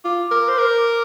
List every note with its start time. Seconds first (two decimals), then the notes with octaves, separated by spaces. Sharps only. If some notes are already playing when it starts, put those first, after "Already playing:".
0.04 F4 D6
0.31 A#4
0.48 C5
0.59 A#4